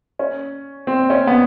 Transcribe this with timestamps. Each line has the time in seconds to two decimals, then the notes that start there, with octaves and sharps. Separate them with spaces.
0.19 C#4
0.87 C4
1.10 C#4
1.27 B3